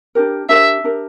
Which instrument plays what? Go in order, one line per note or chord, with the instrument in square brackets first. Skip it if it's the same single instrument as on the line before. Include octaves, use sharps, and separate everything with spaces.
[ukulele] D4 G4 A#4
[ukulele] D4 G4 A#4 [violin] E5
[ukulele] D4 G4 A#4